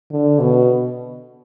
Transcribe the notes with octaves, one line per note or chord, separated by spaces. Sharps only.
D3
B2